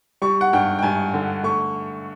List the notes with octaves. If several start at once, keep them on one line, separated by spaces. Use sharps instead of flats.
G3 C#6
F#5
G2 G5
G5
G2 G#5
D3
A3 C#6